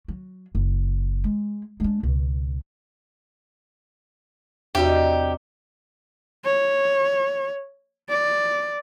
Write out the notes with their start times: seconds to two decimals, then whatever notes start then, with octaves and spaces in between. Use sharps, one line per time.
0.08 F#3
0.55 F#1
1.24 G#3
1.80 G#3 D4
2.03 C#2 B2
4.75 E2 C3 G3 D#4 F#4 G4
6.44 C#5
8.09 D5